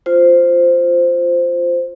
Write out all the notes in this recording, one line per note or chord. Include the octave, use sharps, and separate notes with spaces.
F4 C5